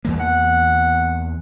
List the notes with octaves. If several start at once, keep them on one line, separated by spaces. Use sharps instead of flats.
E2 E3 A#3
F#5